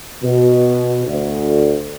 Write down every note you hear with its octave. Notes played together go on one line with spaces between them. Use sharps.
B2
D2